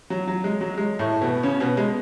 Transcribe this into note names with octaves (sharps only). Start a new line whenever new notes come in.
F#3
F#3
G#3
F#3
G#3
A2 A3
B2 B3
C#3 C#4
B2 B3
G#3